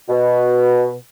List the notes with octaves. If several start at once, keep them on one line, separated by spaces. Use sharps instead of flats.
B2